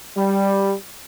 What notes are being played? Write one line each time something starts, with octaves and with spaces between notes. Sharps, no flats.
G3